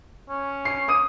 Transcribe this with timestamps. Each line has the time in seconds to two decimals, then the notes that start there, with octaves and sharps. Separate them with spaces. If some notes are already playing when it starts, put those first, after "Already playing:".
0.29 C#4
0.65 C7
0.88 D6 D#6 D#7